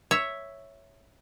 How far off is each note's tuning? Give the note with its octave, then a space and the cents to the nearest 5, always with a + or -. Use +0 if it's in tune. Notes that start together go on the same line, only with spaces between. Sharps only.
C#5 +0 E5 +0